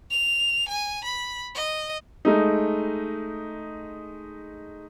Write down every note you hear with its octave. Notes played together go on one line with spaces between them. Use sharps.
F7
G#5
B5
D#5
G#3 A3 D#4